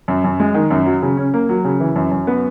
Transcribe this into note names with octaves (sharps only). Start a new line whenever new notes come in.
F#2
F#2
G#3
D#3
F#2
F#3
C#3
C#4
A#3
F#3
C#3
E3
F#2
F#2
B3